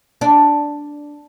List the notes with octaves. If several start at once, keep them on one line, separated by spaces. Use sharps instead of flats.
D4